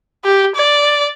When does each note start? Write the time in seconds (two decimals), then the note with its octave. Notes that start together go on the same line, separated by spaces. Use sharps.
0.25 G4
0.56 D5